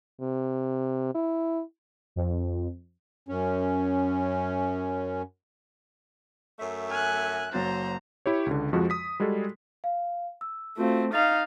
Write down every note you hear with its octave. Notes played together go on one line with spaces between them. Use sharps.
C3
E4
F2
F#2 C#4
F#2 A3 E5
G#5 F6 F#6
F#1 F#3 C5 A#5 A6
E4 G4 C#5
C#2 D3
F2 F3 G#3 F#4
D#6 B6
G3 G#3 F#4 G#4 A4
F5
E6
A3 C4 F4 F#4 F5
D#4 F5 A6 F7